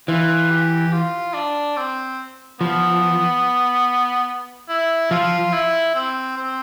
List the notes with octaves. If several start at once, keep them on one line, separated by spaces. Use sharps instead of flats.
E3 F4
G4
F4
D4
C4
F3 B3
E4
F3 F4
E4
C4
C4